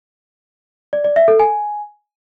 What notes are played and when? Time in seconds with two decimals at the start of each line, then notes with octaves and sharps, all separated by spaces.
0.93 D5
1.05 D5
1.16 E5
1.28 A4
1.40 G#5